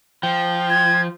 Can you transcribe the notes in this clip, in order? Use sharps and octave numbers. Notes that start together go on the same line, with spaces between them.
F3 G5
G#6